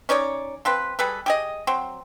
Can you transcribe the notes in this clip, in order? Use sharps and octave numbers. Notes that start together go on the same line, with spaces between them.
C#4 D#4 C#5 D5
F3 C4 B4
G3 G#4 A4 B4
G4 G#4 D#5
F#3 C4